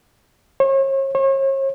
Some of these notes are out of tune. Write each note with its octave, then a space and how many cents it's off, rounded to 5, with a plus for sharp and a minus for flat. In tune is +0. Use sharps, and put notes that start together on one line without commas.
C#5 -40
C#5 -40